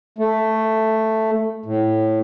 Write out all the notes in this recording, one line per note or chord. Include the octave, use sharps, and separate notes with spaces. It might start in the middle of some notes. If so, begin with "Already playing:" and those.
A3
A2